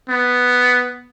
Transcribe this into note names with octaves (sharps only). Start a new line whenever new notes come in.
B3